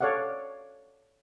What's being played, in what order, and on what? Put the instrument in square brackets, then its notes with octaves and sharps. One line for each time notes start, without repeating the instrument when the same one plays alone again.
[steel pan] A4 C#5 D5 F5 F#5